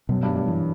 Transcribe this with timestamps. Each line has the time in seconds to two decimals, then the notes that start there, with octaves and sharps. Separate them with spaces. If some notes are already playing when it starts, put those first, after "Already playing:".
0.09 F#2 B2
0.23 G2
0.29 G3
0.35 G2
0.48 E3